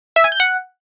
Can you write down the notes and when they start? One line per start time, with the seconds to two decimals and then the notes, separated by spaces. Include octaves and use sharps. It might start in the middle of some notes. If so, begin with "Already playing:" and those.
0.16 E5
0.24 G#5
0.32 G6
0.40 F#5